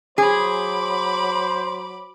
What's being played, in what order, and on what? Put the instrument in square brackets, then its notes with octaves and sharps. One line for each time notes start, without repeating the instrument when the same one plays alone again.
[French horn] F#3 [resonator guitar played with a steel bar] G#4 [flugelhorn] C5 [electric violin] B5 D6